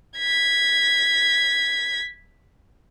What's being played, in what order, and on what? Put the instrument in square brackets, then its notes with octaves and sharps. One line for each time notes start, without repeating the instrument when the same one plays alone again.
[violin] G#6 B6